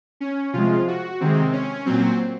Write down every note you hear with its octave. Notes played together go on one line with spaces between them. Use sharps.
C#4
C3 F3 G#3 F4
F#4
C3 D#3 G#3 C4
C#4
A#2 F#3 C4